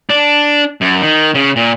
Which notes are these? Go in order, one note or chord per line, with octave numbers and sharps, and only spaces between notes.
D4
F#2
D#3
C#3
A#2